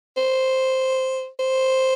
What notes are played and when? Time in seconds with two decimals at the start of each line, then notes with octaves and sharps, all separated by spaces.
0.17 C5
1.40 C5